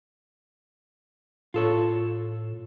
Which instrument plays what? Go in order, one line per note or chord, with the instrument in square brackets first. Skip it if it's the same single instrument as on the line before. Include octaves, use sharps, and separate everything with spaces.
[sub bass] A2 [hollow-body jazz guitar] F4 A4 C#5